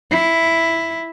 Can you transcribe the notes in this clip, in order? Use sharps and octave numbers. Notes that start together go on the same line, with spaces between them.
E4